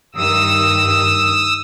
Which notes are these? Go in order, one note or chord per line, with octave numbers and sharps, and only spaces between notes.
G2 D#3 D#6 E6